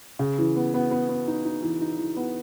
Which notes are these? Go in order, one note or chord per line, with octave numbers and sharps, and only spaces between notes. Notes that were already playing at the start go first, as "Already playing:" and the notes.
C#3
E3
B3
B3
B3
B3
D#4
D#4
E3
D#4
E3
B3